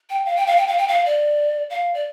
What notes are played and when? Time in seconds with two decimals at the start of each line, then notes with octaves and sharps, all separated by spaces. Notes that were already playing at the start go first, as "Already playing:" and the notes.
0.10 G5
0.26 F5
0.36 G5
0.47 F5
0.57 G5
0.67 F5
0.78 G5
0.88 F5
1.06 D5
1.70 F5
1.94 D5